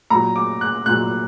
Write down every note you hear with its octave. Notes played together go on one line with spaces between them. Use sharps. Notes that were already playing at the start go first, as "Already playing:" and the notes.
A#2 F#3 A#5
D6
F#6
A#2 F#3 F#6